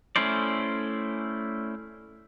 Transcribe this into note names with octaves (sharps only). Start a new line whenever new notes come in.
A3 C#4 E4 C5 D5